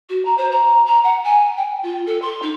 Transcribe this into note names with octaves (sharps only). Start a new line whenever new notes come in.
F#4
A#5
C5
A#5
A#5
F#5
G#5
G5
F4
A4
C6
D#4